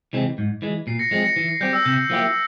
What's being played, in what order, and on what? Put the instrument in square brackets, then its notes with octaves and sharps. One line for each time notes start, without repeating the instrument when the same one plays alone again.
[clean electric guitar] C3 E3 G#3 C4
G#2
E3 G#3
[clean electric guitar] A#2 [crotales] C7
[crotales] A#6 C#7
[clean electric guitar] F3 G#3 C4 [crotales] A#6
[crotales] A#6 C#7
[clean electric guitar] E3
[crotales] C7
[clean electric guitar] G3 C4 G4 [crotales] G6
[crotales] E6
[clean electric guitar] C3 [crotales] G6
[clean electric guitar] F3 A#3 E4 G4